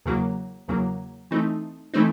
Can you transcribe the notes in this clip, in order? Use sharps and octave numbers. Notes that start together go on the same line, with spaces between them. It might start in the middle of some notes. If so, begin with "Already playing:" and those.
E2 C#3 F#3 A#3
E2 C#3 F#3 A#3
E3 A3 C4 D#4
E3 A3 C4 D#4